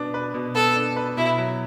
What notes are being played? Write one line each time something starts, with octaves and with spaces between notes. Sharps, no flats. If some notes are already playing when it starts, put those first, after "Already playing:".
Already playing: B2 B3 D4
B4
B2
B3 A4
D4
B4
B2 E4
F#3